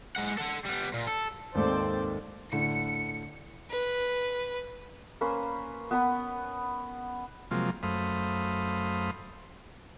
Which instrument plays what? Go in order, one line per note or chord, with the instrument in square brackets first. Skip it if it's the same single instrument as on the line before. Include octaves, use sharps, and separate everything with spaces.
[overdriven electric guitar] G#3 F#5
A4 F#5
G3 B3
A#2
A4
[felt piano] D#2 G#2 A4 [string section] C4 C5 D5
[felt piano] A2 D3 [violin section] C#7
[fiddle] B4
[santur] A#3 C#4 B4 C5
B3 B4 F#5 B5
[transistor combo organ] C3 F3 F#3 G#3 A#3 F4
F#2 A3 C5 F5 B5 D#6